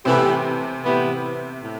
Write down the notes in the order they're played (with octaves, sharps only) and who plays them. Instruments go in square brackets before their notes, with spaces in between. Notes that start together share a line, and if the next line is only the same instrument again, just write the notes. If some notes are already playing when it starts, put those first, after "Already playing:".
[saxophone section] A2 E3 B3 E4 G4 [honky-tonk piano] C3 C4
[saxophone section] A2 E3 B3 E4 G4
A2